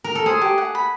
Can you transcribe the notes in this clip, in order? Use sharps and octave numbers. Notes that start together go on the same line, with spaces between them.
A#4
A4
G#4 C5
G4
F#5
B5